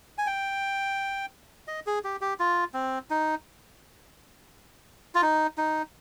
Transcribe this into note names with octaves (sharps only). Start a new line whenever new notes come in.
G#5
G5
D#5
G#4
G4
G4
F4
C4
D#4
F4
D#4
D#4